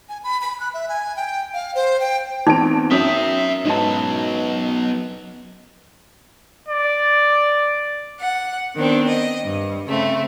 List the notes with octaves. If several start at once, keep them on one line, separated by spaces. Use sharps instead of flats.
G#5
B5
B5
F#6
E5
G#5
G5
F5
C5
G5
E2 C4 D#4 D7
F#2 E5 G5 D#6 B6
G#2 F#3 B3 A5
D5
F#5
D#3 B3 C4 D4
D#5
G2
C#3 A3 C4